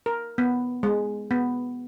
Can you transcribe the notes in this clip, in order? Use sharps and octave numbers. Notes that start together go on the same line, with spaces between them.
A#4
B3
G#3
B3